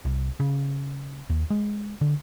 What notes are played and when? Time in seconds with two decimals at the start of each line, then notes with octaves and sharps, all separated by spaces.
0.05 C2
0.40 C#3
1.30 D#2
1.50 G#3
2.01 D3